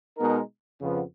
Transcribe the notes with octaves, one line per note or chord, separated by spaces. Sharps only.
B2 G#3 B3 D#4 A#4
F2 C#3 F3 B3